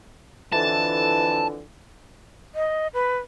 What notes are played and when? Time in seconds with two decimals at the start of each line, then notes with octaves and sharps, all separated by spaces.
0.52 F2 D3 E3 A5
2.55 D#5
2.94 B4